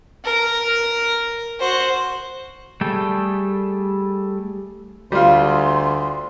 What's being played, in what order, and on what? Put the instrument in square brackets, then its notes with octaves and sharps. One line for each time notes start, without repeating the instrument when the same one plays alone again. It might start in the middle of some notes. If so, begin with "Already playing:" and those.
[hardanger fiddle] A#4
F#4 C5
[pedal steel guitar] G3 A3 G#4 A4 G5
[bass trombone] D2 [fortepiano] G3 F4 [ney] C6